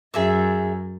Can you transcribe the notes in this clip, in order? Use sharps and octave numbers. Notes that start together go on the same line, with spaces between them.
F#2 G#4 E5 E6